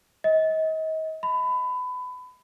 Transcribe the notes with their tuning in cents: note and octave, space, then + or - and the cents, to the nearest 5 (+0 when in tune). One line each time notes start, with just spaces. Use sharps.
D#5 +35
B5 +25